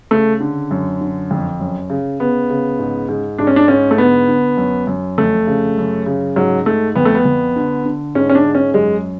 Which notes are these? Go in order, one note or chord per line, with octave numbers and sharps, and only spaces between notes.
C#3 A3
D3
F#2
D3
F2
F#2
C#3
C#3 B3
C#3
G#2
G#2
G#2 D4
C#4
D4
G#2 C#4
A3
D3 B3
D3
F#2
F#2
F2 A3
C#3
F#2
C#3
G#2 F#3
G#2 A3
F2 B3
A3
B3
F2
D3
D3
G#2 C#4
C#4
D4
G#2
C#4
F#2 G#3